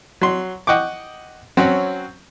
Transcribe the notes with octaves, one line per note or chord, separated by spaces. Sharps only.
F#3 C6
D#5 F#5 G5 C#6 D6
F#3 C4 C#4 F#4